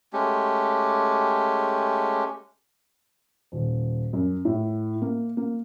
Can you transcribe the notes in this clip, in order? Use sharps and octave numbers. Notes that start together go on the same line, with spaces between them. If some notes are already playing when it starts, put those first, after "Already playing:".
G#3 A3 C#4 G4
D#1
F#2
A2
A#3
A#3